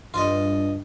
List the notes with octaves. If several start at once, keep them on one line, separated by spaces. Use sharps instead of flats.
G2 F4 D5 D#5 C6